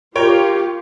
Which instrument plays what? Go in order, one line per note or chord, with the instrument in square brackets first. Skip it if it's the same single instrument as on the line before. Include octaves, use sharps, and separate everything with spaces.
[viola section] F4 G4 [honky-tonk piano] A#4 C#5 G5